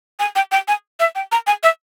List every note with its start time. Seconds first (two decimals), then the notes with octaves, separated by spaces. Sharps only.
0.19 G#5
0.36 G5
0.52 G5
0.68 G#5
1.00 E5
1.15 G5
1.32 A#5
1.47 G#5
1.63 E5